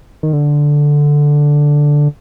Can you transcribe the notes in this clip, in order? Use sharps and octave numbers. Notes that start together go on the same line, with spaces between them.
D#3
D3